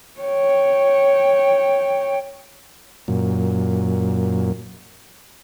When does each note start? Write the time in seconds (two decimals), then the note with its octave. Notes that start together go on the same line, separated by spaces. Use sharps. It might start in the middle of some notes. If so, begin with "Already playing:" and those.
0.21 C#5 G5
3.08 F#2 A#2